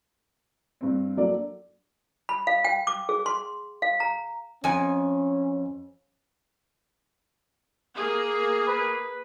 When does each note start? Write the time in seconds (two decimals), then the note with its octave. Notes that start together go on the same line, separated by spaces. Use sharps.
0.81 G2 C4
1.17 F#3 A#3 D4 A4 D5
2.29 B5
2.47 F5
2.64 G5
2.87 D6
3.09 G#4
3.26 C6
3.82 F5
4.00 A#5
4.64 F2 C#4 G#5
7.95 A#3 G#4
8.68 B4